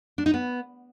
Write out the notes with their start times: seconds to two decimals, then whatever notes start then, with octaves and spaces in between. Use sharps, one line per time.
0.18 D4
0.26 D#4
0.34 B3